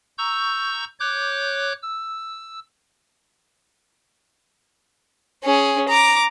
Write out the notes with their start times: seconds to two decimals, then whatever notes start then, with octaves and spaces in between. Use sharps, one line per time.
0.18 A#5 C#6 E6 G6
1.00 C#5 D6 F#6 G6
1.82 E6
5.43 C#4 G#4
5.88 A#5 D6